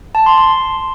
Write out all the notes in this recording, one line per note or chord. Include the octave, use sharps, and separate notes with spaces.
A5
C6
C6